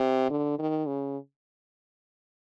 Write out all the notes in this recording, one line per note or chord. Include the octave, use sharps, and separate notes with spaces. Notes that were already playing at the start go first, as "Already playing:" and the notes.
Already playing: C3
D3
D#3
C#3